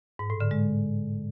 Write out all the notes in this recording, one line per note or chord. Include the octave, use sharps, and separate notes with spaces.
G#2
A2
D3
G#3